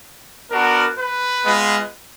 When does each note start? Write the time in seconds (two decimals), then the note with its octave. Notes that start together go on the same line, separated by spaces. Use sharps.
0.51 B3 D4 F#4 A#4
0.98 B4
1.45 G#3 B3 F4